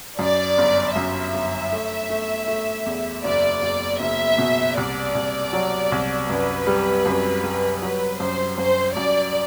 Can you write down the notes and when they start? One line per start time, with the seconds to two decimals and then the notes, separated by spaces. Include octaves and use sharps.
0.19 F#2 D5
0.58 G1
0.96 F#2 E5
1.34 G1
1.72 A3
2.10 A3
2.48 A3
2.86 E2
3.24 F#1 D5
3.62 F#1
4.00 F#1 E5
4.38 B2
4.77 C2 D5
5.15 C2
5.53 F#3
5.92 C2
6.29 F#2 B4
6.67 G3
7.06 F#2
7.44 G3
7.81 F#3 B4
8.20 F#2 C5
8.58 F#2 C5
8.96 F#2 D5